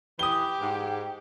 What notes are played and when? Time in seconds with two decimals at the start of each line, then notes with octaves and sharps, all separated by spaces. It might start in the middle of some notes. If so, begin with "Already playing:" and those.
0.19 E3 G4 D#6 G7
0.61 G#2